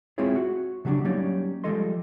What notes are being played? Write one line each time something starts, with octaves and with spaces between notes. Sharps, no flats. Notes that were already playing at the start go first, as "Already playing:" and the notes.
G#3 C4 E4 F4 G#4 C#5
F#4
C#3 F#3 G3 C4 D4
F#3 G3 A#3 C#4 D#4 D5
F3 G3 G#3 A4 D#5 C6